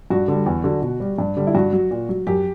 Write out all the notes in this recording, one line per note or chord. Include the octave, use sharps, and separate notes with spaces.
G2 F#4
D3 G3
E2
D3 F#3
B2
G3
G2
D3 G3
E4
G2 F#4
F#3
A#2
F#3
F#2 G4